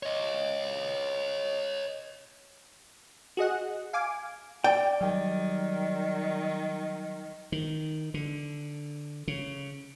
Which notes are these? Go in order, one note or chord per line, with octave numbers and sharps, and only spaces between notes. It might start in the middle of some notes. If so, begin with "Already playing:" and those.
C#5 D#5
F#4 G#4 D#5 F#5
F5 G#5 D6
D5 G5
D#3 F#3 G3
D#3
D3
C#3